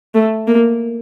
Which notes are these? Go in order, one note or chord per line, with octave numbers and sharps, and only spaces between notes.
A3
A#3